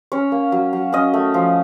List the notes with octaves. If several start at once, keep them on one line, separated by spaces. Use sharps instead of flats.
C#4 C#5
A#3
F#3
F#3
C#4 D#5
A3
F3